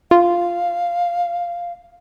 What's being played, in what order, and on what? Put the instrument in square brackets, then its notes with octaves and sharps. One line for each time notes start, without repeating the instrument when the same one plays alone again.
[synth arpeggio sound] F4 [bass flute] F5